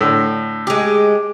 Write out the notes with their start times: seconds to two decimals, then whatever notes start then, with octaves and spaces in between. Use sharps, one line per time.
0.01 A2 D3
0.67 G#3 G4